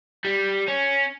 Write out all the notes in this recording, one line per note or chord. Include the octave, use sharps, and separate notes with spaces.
G3
C#4